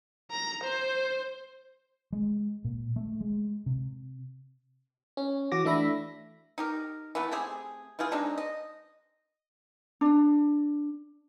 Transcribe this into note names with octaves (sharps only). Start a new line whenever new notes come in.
A#5
C5
G#3
A#2
A3
G#3
C3
C#4
E3 F#4 D6 A#6
E3 A3 D4 E5 B5 A#6
D#4 G4 A#4
E3 A3 B3
A3 C4 G4 G#4
E3 G3 F4 G#4
G#3 C4 D4 D#4
D#5
D4